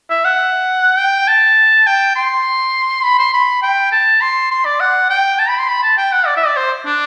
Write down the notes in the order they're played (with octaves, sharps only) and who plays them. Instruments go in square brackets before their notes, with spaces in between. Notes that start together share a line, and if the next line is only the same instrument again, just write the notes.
[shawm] E5
F#5
G5
A5
G5
C6
B5
C6
B5
G5
A5
C6
C6
D5
F#5
G5
A5
B5
C6
B5
A5
G5
F#5
D5
E5
D5
C5
D4